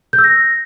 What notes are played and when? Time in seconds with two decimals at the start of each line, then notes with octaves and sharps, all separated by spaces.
0.13 G6
0.18 E6
0.24 A#6